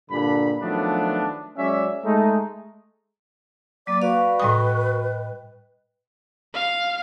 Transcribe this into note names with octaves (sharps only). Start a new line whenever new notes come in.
G2 A#2 D3 D4 B5
D#3 F3 F#3 A3 B3 D4
F#3 G#3 C#4 D5 E5
G#3 A3 D#4
F#3 A#3 D5 D6
F#4 B4 D5 F5
A2 G3 D#5 G5 D#6
F5